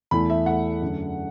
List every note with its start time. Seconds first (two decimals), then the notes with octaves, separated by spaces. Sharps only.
0.11 E2 E3 A3 B5
0.30 E5
0.46 E2 E3 A3 F#5
0.82 F#2 D3 A3